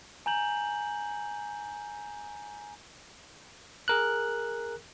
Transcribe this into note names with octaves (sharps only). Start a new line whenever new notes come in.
G#5 A#5 G6 F#7
G#4 A#4 F#6